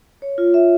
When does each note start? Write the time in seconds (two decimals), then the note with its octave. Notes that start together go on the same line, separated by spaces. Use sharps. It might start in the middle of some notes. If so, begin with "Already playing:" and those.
0.22 C#5
0.38 F4
0.54 E5